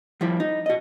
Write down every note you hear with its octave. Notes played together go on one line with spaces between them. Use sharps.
F3 G3 E4
D#4
F#4 D#5